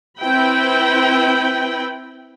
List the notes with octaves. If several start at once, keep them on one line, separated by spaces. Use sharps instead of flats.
C4 E4 B4 G5 B5